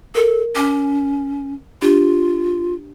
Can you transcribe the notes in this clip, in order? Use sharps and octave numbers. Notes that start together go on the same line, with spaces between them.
A4 A#4
C#4 D6
D4 F4 G4